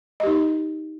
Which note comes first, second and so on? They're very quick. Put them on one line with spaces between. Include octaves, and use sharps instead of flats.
D#5 G4 D#4